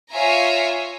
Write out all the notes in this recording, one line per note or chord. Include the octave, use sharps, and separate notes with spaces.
F4 C#5 E5 G#5 A#5